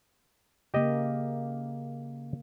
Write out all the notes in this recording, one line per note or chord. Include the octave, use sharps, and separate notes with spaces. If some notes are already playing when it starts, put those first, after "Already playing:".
C#3 A#3 G4 D#5